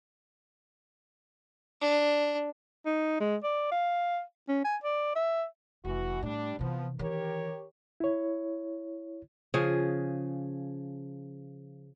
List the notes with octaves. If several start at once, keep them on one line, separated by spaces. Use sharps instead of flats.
D4
D#4
G#3
D5
F5
C#4
G#5
D5
E5
F1 E3 F#4
A2 G3 D4
C3 E3 F3 B3
D#3 E3 G4 A#4 C#5
E4 C#5
C#3 F3 G#4